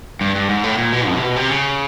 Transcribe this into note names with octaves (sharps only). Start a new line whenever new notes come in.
G2
G2
G#2
A2
A#2
B2
F2
C3
B2
C3
C#3